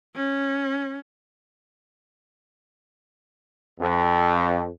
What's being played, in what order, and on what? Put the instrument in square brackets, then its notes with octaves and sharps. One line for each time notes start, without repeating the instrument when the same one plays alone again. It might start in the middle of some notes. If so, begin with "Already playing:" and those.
[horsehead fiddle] C#4
[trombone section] F2